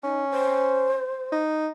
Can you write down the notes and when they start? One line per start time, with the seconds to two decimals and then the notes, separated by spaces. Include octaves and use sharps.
0.03 C#4 D#4
0.31 C5
1.32 D#4